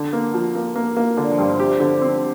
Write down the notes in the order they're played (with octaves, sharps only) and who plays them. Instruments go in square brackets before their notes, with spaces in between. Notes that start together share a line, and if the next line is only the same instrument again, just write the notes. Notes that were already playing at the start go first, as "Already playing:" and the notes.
Already playing: [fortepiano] D3
A#3
F3
A#3
A#3
A#3
[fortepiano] D3 [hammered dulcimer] D4
[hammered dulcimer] F3
[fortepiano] G2
[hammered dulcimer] D3
[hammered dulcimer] C3 [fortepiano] G4
[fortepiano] D3
C4